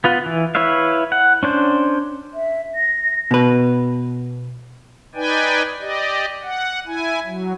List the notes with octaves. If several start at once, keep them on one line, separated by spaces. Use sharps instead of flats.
B3 F4 B4
E3
E4 B4 C#5 E5 F5
F#5
C#4 D4 C5
E5
A#6
B2 B4
D#4 B4 D5 G5 G#5
G4 D5 D#5
F#5
E4 G#5
F#3